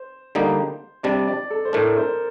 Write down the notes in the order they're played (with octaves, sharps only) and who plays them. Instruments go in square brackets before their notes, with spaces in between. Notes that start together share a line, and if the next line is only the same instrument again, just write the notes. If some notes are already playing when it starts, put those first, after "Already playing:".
Already playing: [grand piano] C5
[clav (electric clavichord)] D3 G3 A#3 D#4
[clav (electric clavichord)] C3 G3 D4 [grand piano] D5
[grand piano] D5
A4
C5
[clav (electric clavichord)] A2 A3 D4 [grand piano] A#4
[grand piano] C5